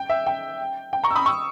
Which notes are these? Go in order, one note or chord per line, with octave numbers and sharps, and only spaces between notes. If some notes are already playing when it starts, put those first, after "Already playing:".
Already playing: G5
E5
G5
G5
A#5 C#6
E6
B5 D#6
C#6 E6